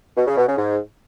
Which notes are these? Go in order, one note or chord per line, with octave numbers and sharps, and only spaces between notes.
B2
C#3
B2
C#3
G#2